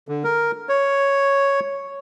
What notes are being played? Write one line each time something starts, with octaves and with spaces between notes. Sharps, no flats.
D3
A#4
C#5